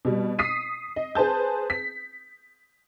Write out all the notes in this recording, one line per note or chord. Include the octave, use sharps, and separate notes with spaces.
B2 G3
D#6 B6 C7 D#7
D#5
G#4 B4 C5 A5 G6
B6